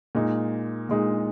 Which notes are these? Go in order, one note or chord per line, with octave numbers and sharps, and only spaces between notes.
A#2 G#3 D#4
A#2 G#3 D#4